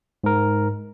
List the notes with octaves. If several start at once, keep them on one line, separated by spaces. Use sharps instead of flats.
G#2 A#4